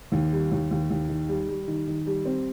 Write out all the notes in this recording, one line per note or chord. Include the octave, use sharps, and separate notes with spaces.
D#2
G3
D#2
D#2
D#2
D#3
G3
G3
D#3
D#3
G3
C4